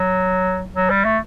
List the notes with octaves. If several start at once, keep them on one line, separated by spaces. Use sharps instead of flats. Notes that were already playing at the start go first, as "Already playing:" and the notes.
Already playing: F#3
F#3
G3
A3